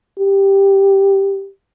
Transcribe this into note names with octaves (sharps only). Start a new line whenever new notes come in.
G4